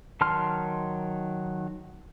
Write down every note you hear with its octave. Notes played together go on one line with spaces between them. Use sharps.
D#3 F#3 A5 C6 F6